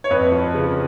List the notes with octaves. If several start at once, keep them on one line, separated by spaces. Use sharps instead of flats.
C#5
F2 B4
F3
C#3